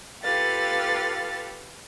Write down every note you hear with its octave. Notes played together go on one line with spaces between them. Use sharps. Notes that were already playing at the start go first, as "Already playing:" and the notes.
F4 G4 A4 B4 F5 A6